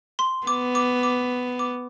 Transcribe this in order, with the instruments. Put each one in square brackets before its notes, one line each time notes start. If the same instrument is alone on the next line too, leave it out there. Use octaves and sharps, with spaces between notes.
[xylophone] C6
[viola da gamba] B3 [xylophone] D6
[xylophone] D6
D6
D6